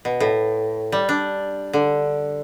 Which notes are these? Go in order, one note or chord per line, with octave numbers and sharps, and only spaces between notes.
B2
A2
G3
D4
D3